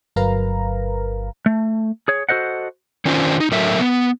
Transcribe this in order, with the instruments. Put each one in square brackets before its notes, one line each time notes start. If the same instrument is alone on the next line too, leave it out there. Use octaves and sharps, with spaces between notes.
[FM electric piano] G1 F#3 A#4 B4 F5 A#5
[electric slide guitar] A3
G#4 C#5
F#4 A4 C5 D#5 F#5
D#3 C#4 D4 F4 C5
D#4
A2 D3 F#3 A4 A#4 E5
B3